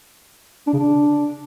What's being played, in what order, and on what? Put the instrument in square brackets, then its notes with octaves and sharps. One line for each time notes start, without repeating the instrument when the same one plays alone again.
[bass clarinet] D4
C#3
D4